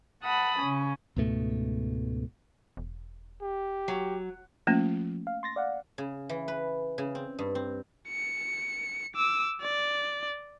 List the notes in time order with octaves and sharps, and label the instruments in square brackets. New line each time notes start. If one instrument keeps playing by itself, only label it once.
[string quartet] F#5 A5 B5 D#6
C#3 C#4
[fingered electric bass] C#2 G#2 B2 A3
[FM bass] E1
[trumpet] G4
[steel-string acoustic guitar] F#3
[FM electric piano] F3 [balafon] A3 A#3 C#4
[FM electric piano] F5
C6 A6 A#6
D5 F5 F#5
[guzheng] C#3
E3
B4
C#3
C4
G2
C4
[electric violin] C#7
D6 E6
D5